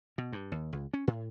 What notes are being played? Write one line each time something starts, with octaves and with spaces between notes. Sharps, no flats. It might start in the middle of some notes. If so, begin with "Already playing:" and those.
B2
G2
D#2
C#2
C#4
A2